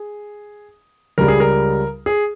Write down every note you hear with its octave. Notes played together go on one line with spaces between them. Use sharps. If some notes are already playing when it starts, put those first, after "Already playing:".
Already playing: G#4
C#2 C#3 G3 A#4
G#4
A#4
G#4